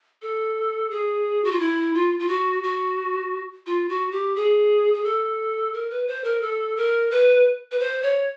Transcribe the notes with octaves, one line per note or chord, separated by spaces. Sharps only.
A4
G#4
F#4
F4
E4
F4
F4
F#4
F#4
F4
F#4
G4
G#4
G#4
A4
A#4
B4
C5
A#4
A4
A#4
B4
B4
C5
C#5